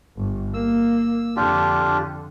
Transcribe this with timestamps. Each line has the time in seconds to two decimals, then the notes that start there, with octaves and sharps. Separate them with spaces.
0.17 G1
0.54 A#3 E6
1.36 F2 D3 D4 F4 G4